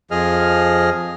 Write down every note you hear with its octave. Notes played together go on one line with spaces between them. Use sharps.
F2 F3 G#4 D#5 F6